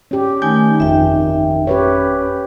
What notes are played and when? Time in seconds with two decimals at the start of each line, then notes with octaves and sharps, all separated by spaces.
0.11 C#4 G4
0.42 D#3 A3 D#4 G#5 G6
0.80 G1 F2 E5 G5
1.67 C#4 G4 B4 C#5